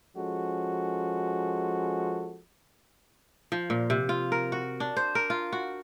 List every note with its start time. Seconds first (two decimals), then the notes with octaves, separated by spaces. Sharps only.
0.16 F3 G#3 C#4 F#4 A4
3.52 F3
3.70 A#2
3.90 C3
4.09 F4
4.32 A#4
4.52 F#4
4.80 D4
4.97 C5
5.15 A#4
5.30 F4
5.53 F#4